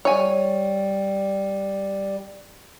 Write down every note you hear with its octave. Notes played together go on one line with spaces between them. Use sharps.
G3 C#5 G#5